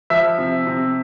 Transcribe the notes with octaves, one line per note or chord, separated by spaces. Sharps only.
F3 E5
C3
C3